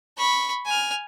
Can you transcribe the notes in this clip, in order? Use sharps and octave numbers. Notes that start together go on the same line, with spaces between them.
B5 C#6
G#5 F6